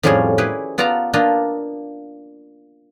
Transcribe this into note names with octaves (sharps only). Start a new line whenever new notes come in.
F2 A2 G3 C#4 F4 G#4
E4 G4 G#4 B4
B3 F4 D5 A5 A#5
A#3 D4 F4 D#5